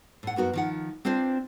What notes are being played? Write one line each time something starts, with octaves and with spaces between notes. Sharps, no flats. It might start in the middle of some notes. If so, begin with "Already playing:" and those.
A2 F#5
F#2 B3 F#4 A#4
D#3 F3 F#5
C4 D4 F4 C5 D5